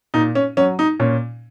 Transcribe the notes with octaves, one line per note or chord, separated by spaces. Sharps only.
A#2 D#4
C#4
F#3 C#4
D#4
A#2 C#4